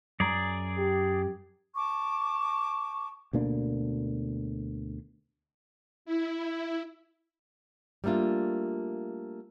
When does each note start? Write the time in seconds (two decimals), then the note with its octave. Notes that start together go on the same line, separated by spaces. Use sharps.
0.20 F#2 G#4 D5 A#5
0.77 G4
1.76 A5 C#6 D6
3.33 D2 B2 A#3 D4
6.05 E4
8.04 G3 A3 A#3 D4 F4